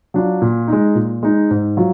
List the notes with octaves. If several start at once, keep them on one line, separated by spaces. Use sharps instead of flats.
F#3 D4 F4
A#2
G#3 D#4
A#2
G#3 D#4
G#2
F#3 F4